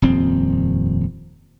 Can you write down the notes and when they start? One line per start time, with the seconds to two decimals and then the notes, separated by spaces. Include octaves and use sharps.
0.02 D#1 F2 C4